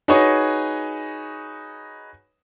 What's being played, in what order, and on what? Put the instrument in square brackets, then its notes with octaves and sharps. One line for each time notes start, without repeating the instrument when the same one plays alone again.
[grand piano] D#4 F#4 G#4 B4 C#5 D#5